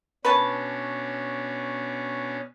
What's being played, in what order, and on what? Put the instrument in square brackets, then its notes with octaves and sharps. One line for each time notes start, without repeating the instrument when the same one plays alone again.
[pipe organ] B2 C#4 D4 [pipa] B4 C#5 A5